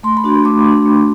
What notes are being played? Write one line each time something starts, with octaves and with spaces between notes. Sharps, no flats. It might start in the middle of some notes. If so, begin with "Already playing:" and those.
A3 C6
B5
D4 F#4
A3 D6
D4 F#4
A3